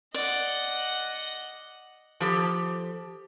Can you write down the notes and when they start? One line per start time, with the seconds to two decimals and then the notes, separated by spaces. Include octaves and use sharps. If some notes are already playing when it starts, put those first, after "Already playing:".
0.14 D5 D#5 F#5
2.20 F3 G4 A4